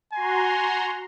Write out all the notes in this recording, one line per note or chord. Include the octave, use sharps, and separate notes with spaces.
F#4 G#5 A#5 C6